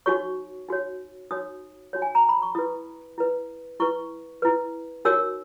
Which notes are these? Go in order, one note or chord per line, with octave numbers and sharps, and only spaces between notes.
D#4 F#4 C#5 C#6
D#4 F#4 C#5
D#4 F#4 C#5 D#6
D#4 F#4 C#5
G#5
A#5
B5
C#6
E4 B4 D#6
E4 B4
E4 B4 C#6
E4 B4
D#4 F#4 A#4 C#5 E6